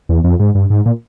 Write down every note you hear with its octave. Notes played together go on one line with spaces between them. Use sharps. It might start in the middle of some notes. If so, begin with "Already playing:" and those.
E2
F2
G#2
G2
G#2
A#2